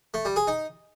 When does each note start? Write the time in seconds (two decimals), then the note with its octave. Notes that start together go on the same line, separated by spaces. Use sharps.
0.14 A3
0.25 G3
0.36 G#4
0.47 D#4